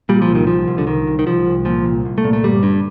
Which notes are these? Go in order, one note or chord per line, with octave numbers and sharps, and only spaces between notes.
A#2 G3
F3
C2
D#3
C2 F3
C2
D3
C2 D#3
C2
D#3
C2 F3
C2
A#2 F3
C2
C2
A3
A#2
A3
G1 G3
G2